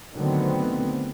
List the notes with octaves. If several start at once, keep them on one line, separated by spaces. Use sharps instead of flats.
D3 D#3 F#3 A3 B3 C4